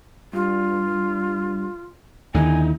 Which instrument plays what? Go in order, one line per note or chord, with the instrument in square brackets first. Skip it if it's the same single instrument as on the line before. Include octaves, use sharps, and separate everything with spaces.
[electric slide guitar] G2 [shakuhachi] F4
[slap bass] D#2 D3 [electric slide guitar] D#4 E4 [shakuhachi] G#5